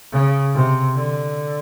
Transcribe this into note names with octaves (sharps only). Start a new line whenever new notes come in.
C#3
C3
D3